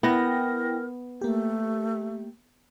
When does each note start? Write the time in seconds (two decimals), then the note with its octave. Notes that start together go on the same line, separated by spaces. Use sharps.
0.03 B3 E4 A#4 G5 A#6
1.21 A3 A#3 G4